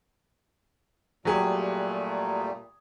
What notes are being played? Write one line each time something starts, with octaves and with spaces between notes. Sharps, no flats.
A#2 F#3 G3 A3 G4 G#4